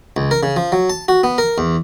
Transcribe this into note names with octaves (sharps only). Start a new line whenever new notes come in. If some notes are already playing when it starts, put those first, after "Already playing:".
C#2
A#4
C#3
F3
F#3
A5
F#4
B3
A#4
E2